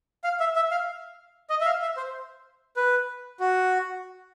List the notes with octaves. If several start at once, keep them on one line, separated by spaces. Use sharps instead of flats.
F5
E5
E5
F5
D#5
E5
F5
E5
C5
B4
F#4